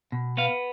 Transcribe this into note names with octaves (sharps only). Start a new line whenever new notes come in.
B2
B3 F5